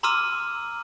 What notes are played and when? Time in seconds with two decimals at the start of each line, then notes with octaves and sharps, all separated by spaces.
0.03 A#5 C6 D6 E6 F6 D#7